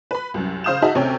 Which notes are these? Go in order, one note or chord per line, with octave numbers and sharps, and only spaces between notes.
B4 B5
C2 F#2
C#3 C5 F5 D#6 G6 E7
D#4 F#4 G#4 D#5 E5 A5
D2 C3 C#4 C#5 G5